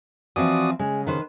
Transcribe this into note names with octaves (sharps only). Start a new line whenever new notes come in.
E3 F3 C4 F#4 D5 D#6
C#3 G#3
D#3 B4 C5